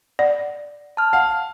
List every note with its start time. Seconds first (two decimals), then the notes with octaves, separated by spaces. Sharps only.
0.19 D5 F#5
0.97 A5 F6
1.13 F5 F#5